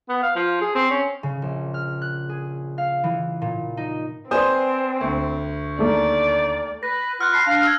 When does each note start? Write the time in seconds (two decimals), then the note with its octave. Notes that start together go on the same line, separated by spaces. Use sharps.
0.09 B3
0.23 F5
0.36 F3
0.61 G#4
0.75 C4
0.90 C#4
1.23 C#3
1.42 A#1
1.74 F6
2.02 F#6
2.29 G#4
2.78 F5
3.04 E3
3.42 A#2
3.77 D#4
4.31 C4 B4 C5 D5 G#5 D#6
5.01 D2
5.79 D#2 A3 A#3 D5
6.83 B4 A#6
7.21 F4 F#5 F6 F#6
7.32 A5 B5 C6
7.47 D4 F5
7.64 E6 G#6